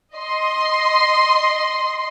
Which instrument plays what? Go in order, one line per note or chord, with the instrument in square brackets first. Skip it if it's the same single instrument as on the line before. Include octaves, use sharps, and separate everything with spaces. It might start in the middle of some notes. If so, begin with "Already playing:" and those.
[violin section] D#5 C6